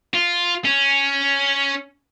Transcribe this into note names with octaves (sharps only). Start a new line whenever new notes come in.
F4
C#4